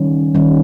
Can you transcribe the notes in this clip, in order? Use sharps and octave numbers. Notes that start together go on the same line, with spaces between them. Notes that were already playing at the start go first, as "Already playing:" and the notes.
Already playing: D#3 G3 C#4
D#3 G3 C#4